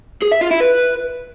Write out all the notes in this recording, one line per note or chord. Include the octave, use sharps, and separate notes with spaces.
G#4
E5
F4
E4
B4